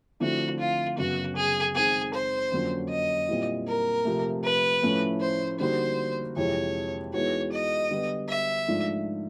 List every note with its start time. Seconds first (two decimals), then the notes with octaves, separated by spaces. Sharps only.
0.20 D3 F3 A3 C4 E4 F#4
0.59 F4
0.98 F#2 C#3 F#3 B3 F#4
1.36 G#4
1.75 D#3 G#3 C4 G#4
2.14 C5
2.52 F2 D3 F#3 A#3 C#4
2.90 D#5
3.29 A#2 G3 C4 E4
3.67 A#4
4.05 C3 F3 A3
4.44 B4
4.83 A2 F3 A3 C#4 E4
5.20 C5
5.59 D3 G3 A#3 D#4 F#4 C5
6.36 F2 C3 E3 G#3 C#5
7.13 E3 G#3 B3 D#4 F#4 C#5
7.52 D#5
7.90 D3 G3 B3
8.29 E5
8.68 G#2 F3 A3 D4 F4